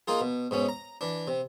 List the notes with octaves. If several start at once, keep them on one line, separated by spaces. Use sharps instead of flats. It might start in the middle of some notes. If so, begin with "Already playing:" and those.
A#3 D#4 F4 G#4
B2
G#2 B2 C#4
A#5
E3 D4
C3